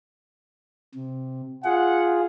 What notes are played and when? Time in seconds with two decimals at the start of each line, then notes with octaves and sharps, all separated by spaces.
0.95 C3
1.64 F4 G#4 F#5